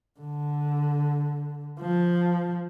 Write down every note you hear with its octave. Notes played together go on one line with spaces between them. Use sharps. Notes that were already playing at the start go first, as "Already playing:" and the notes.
D3
F3